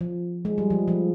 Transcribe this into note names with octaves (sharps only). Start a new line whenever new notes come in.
F3
G#3
G3
F3
F3